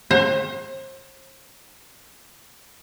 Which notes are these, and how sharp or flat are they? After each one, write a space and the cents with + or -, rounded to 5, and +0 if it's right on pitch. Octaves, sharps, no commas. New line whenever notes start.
C5 +40